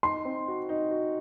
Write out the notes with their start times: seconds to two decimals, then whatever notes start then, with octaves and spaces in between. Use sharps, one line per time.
0.03 D#4 C6
0.25 C4
0.48 F#4
0.69 D#4
0.91 F#4